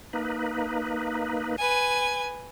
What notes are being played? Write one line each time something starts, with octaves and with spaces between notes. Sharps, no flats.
A#3 D#4 B4
B4 G#5